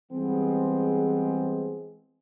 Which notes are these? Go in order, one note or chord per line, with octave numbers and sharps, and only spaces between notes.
E3 G3 G#3 B3 C4 G#4